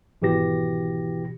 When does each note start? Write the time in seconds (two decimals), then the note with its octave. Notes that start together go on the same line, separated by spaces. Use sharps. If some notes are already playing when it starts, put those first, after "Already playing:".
0.22 G#1 B2 E3 G4 A#6